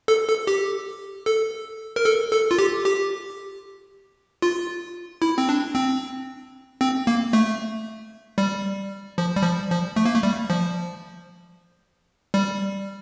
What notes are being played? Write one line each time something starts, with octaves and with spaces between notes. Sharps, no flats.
A4
A4
G4
A4
A#4
A4
A4
F4
G4
G4
F4
E4
C4
D4
C4
C4
A#3
A3
G3
F3
G3
F3
F3
A3
A#3
A3
G3
F3
G3